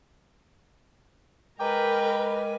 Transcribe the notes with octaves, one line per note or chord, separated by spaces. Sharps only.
G#3 A#4 B4 D#5 G5 G#5 A#5 D6